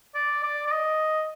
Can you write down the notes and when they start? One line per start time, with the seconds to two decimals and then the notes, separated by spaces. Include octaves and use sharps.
0.15 D5
0.43 D5
0.67 D5
0.72 D#5